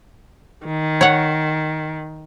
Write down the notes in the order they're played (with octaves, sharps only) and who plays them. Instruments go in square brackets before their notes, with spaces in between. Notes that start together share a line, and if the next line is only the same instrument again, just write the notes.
[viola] D#3
[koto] C#5 F#5